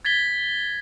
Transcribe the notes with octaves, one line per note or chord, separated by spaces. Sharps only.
G#6 A6 B6 G7